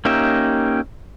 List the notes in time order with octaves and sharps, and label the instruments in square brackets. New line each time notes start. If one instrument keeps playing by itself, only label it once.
[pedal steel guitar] A#3 C#4 D#4 G4 E5